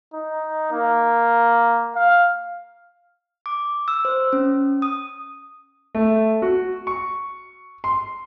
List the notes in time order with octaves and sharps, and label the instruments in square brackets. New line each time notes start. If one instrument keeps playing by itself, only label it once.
[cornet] D#4
A#3
F5
[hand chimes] D6
E6
C5
C#4
D#6
[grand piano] A3
F#4
C#6
C6